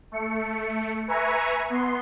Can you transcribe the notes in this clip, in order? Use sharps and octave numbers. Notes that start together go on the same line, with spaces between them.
A3 C#7
B4 E5 G#5 A#5 C#6
B3 C6